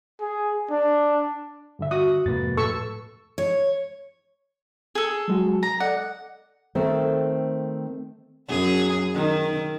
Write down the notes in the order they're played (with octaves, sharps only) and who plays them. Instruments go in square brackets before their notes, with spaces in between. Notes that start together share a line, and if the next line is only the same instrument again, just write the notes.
[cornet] G#4
D4
[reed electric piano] G2 D3 E5
[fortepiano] F#4 [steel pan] D#6
[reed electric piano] F2 B4 A6 [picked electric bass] G#2 C3 A#3
[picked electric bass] A2 [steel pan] A4 C#6 E6
[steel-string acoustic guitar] C#5
[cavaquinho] G#4 A4
[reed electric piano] F#3 G#3 F#4
[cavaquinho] A#5
[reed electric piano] A4 D5 D#5 [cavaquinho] F#5
[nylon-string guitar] D#3 A3 C4 A4 C5
[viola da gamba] F#2 G#4
D#3